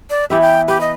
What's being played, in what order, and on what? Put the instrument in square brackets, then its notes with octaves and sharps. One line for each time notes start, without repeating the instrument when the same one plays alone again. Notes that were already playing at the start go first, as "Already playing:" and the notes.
[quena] D5
[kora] E3 B3 E5 [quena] G4
[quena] G5
[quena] G4 [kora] B4
[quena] D#5